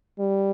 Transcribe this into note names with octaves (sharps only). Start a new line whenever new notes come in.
G3